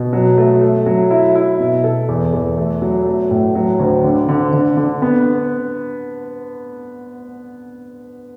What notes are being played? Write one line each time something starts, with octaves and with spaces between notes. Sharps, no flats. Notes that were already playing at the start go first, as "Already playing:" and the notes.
Already playing: B2
F#3
A3
A3
F#3
E4
E4
B2
A4
E2
E2
A3
F#3
A3
A2
F#3
D2
D3
D3
D3
D3
B3